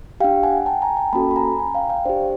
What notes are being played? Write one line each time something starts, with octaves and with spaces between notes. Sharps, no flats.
D4 G4 F5 G5
F#5 G#5
G5 A5
G#5 A#5
G5 A5
A#3 C#4 F#4 A4 A5 B5
B5
G#5 A#5
G#5 A#5
F5 G5
F5 G5
D4 G4 C5 D5